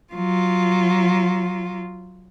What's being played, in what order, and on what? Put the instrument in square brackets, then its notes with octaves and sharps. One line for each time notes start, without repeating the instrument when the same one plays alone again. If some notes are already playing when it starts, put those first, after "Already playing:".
[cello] F#3 F4